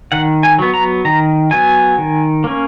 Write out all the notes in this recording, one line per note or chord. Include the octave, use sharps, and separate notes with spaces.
D#3 F#5
G#5
F#3 B3
A#5
D#3 A#5
F#3 B3 G#5
D#3
A#3 C#4